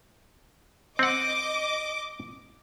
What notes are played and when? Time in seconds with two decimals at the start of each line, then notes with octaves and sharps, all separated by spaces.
0.99 C4 D#5 F#5 D6